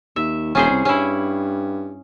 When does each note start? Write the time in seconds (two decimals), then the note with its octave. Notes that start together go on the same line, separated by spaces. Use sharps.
0.16 D#2 E5
0.55 E1 C#4 G#4 C5
0.70 C2
0.85 G2 C#4 E4